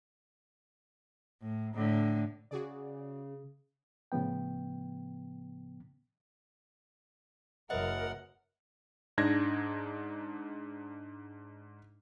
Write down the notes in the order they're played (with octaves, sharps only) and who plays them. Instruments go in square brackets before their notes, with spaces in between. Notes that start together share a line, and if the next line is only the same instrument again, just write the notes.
[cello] A2
A2 D3
[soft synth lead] C#3 [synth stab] F#4 G#4 D5
[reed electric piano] A2 C#3 F3 B3 G5
[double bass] F#1 F#2 [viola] A#4 [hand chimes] B4 D#5 E5 [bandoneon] F#5
[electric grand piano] G#2 D4 D#4 G#6 A#6